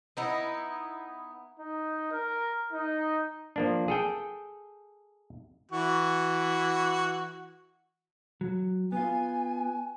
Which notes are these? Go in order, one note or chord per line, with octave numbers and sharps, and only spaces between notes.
B3 D#4 E4
D#4
A#4
D#4
F3 A#3 D4
G#4 A4 G5
E3 F#4
F#3
B3 F4 G#5